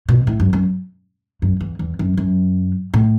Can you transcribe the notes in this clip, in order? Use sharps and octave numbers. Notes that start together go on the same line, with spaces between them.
B2
A2
F#2
F#2
F#2
E2
E2
F#2
F#2
A2